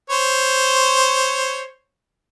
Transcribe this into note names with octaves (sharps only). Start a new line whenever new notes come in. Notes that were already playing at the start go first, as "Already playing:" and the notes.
C5 C#5